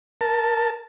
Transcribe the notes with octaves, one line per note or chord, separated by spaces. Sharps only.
A#4 A5